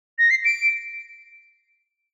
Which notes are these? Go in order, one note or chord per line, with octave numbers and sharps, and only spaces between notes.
A#6
C7
D7